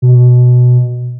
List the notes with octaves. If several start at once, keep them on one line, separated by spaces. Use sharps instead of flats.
B2